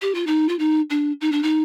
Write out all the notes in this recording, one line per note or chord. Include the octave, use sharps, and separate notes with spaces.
G4
F4
D#4
F4
D#4
D4
D#4
D4
D#4